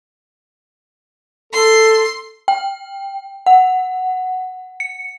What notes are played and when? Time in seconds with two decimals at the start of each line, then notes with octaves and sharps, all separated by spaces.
1.53 A4 C6
2.48 G5
3.46 F#5
4.80 C#7